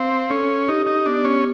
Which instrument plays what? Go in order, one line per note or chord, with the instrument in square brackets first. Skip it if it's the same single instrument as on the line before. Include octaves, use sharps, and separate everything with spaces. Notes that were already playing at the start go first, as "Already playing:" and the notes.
Already playing: [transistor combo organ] C4 [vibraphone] F5
[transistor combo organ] C#4 [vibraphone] A4
[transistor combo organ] D#4 [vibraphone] G4
[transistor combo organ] D#4
[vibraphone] B3 [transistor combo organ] D4
[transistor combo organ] C#4